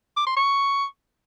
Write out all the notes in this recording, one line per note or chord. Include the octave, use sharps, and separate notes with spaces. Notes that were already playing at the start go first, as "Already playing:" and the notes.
D6
C6
C#6